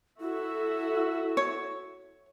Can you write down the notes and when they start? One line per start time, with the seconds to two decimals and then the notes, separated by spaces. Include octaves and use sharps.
0.20 E4 F#4 A4 E5
1.37 C#5